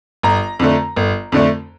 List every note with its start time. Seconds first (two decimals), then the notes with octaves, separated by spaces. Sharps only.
0.23 G1 A#5
0.59 F2 D3 A3
0.96 G1
1.32 F2 D3 A3